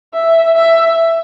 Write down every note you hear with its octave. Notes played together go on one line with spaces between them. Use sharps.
E5
E5